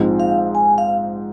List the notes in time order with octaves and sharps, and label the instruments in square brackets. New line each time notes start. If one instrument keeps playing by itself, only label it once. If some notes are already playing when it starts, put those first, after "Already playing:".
Already playing: [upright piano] A#1 G#2 F3 C4 D#4
[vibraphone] F5
G#5
F5